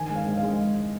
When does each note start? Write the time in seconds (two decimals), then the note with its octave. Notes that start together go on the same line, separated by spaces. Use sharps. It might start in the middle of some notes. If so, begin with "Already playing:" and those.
Already playing: D#3 G#5
0.10 G#3
0.15 F5
0.26 G#3
0.37 F5
0.43 G#3